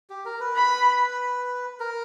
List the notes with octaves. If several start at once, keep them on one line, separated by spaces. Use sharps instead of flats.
G4
A#4
B4
B5
A#4